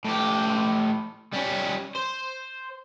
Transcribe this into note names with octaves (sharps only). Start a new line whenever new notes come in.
A2 G4
G3 C#4
C5